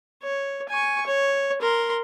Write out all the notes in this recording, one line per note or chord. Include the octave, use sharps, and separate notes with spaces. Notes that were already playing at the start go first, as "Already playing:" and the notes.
C#5
G#5 C#6
C#5
A#4 C6